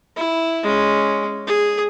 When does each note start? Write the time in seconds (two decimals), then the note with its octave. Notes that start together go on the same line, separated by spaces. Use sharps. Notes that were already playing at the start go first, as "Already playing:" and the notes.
0.16 E4
0.63 G#3 C#4
1.47 G#4